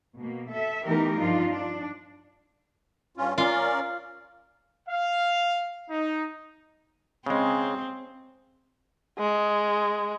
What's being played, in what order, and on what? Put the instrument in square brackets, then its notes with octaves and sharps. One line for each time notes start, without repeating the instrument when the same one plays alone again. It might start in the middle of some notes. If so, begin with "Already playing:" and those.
[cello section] B2 A#3
A4 E5
E3 A3 B3 D#4 G4 A#4
G2 F3 D4 D#4 F4
D4
[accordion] G2 C#4 F4
[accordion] C#4 A#4 D5 [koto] F4
[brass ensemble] F5
D#4
[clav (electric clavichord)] C#3 G#3 [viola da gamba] C4
[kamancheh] G#3